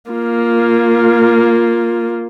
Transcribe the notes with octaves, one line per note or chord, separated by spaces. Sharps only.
A#3 F4